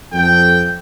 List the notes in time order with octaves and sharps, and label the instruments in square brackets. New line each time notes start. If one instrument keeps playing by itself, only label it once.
[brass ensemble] F2 A4 G5